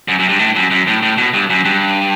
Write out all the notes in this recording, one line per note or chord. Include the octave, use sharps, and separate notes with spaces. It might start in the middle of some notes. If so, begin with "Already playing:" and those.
F#2
F#2
G2
A2
F#2
F#2
A2
A2
B2
G2
F#2
G2